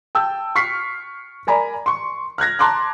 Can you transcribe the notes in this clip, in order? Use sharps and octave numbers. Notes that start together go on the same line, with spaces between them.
G5 A5 E6 G6
C#6 F6 B6 C7
A#4 D5 G#5 A#5 B5
C6 C#6
F6 F#6 G#6 A#6
A5 A#5 C6 D6 F#6